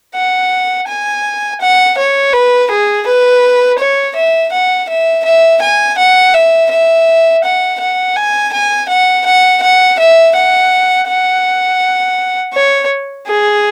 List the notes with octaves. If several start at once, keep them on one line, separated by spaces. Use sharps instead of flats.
F#5
G#5
F#5
C#5
B4
G#4
B4
C#5
E5
F#5
E5
E5
G#5
F#5
E5
E5
F#5
F#5
G#5
G#5
F#5
F#5
F#5
E5
F#5
F#5
C#5
G#4